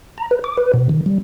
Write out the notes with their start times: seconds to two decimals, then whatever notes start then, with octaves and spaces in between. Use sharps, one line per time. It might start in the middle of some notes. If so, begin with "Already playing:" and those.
0.18 A#5
0.31 B4
0.44 D6
0.57 B4
0.74 B2
0.89 D#3
1.06 G3